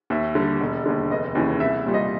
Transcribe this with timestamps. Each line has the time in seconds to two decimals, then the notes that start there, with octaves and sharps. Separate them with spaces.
0.10 D#2 E5
0.35 D3 G3
0.60 E1
0.86 D#2 D3
1.11 F1 D#5
1.35 D#2 C#3 E3
1.60 C2 E5
1.86 A#2 G3
1.94 D#5